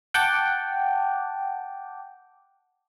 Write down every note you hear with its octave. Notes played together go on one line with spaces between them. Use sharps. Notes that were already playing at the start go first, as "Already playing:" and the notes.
F#5 G5 A5 D6